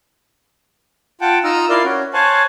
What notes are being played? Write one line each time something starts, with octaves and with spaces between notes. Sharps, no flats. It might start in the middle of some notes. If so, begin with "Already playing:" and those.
F4 F#5 G5 A5
D#4 F4 D#5 A#5 E6 F6
E4 F4 A#4 D5 F5 C6
C#4 F#4
C5 C#5 F5 G#5 A5 F#6